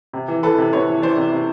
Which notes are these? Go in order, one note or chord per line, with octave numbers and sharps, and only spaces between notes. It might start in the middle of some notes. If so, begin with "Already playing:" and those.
C3
E3
E3 A4 B4
C3
C3 B4 C#5
E3
E3 C5 D5
C3
C3